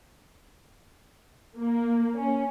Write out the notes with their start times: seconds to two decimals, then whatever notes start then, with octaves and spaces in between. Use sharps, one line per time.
1.58 A#3
2.15 C#4